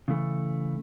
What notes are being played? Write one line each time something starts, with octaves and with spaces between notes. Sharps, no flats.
C#3 E3 A3